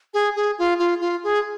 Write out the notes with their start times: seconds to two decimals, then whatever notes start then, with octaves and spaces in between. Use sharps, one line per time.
0.14 G#4
0.36 G#4
0.58 F4
0.79 F4
1.01 F4
1.24 G#4